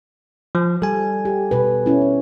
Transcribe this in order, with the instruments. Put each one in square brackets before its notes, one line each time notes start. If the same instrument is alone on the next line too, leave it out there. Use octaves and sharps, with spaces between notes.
[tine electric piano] F3
[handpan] G3 [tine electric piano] A4 G#5
[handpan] G4
B2 B4
C#4 E4